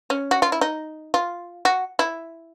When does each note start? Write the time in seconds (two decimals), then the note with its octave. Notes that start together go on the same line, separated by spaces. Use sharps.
0.10 C#4
0.31 F#4
0.42 F4
0.52 E4
0.61 D#4
1.14 F4
1.65 F#4
1.99 E4